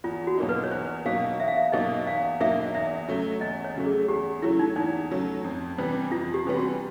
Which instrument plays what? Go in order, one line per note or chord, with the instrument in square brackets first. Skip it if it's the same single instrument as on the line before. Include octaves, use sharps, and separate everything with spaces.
[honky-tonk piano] E2 [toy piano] F4
[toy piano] F#4
[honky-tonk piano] B2 F#3 A#3 D#4
[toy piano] B4
C#5
[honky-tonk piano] E2 [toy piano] C5
[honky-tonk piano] B2 F#3 A#3 D#4 [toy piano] F5
[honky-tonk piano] E2 [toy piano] E5
[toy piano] F5
E5
[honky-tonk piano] B2 F#3 A#3 D#4 [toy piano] D#5
[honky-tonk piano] E2 [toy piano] F5
[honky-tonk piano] B2 F#3 A#3 D#4 [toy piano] E5
[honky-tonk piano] E2 [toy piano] E5
[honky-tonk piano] C#3 F#3 A3
[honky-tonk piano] E2 [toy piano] D#5
[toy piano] C#5
[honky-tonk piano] C#3 F#3 A3
[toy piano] G#4
[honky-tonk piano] E2 [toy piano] G4
[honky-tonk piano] C#3 F#3 A3 [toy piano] E4
[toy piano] D#4
[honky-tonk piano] E2 [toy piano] D#4
[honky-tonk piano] C#3 F#3 A3
F2
C3 E3 G3 B3
[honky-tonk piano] F2 [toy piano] F4
[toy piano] G4
[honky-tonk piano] C3 E3 G3 B3
[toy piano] F#4